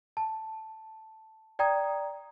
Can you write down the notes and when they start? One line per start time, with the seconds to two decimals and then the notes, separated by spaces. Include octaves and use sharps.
0.17 A5
1.59 D5 G5 A#5 D#6 G#6